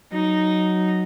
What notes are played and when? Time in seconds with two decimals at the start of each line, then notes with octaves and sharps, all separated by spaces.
0.12 F#3 D#4